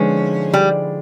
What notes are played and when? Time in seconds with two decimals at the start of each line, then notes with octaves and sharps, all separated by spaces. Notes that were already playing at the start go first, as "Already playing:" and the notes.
Already playing: D3 F3 G#3 B3 C#4 D#4
0.54 G3